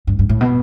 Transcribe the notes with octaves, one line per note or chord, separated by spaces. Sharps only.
G2
G2
A2
B2